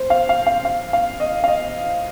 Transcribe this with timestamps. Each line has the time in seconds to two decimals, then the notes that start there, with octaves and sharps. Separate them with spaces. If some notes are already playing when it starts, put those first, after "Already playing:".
Already playing: C5
0.10 F5
0.29 F5
0.46 F5
0.65 F5
0.93 F5
1.20 D#5
1.44 F5
1.48 D#5